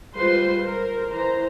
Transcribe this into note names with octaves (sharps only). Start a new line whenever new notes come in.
G3 G#3 F4 B4 C5 C6
A#4 C5
E3 C5 A#5